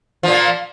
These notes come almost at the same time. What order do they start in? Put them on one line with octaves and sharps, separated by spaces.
F3 A#2 A#3